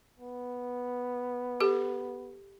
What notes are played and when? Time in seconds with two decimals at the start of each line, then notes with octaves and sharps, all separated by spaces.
0.20 B3
1.60 G4 A4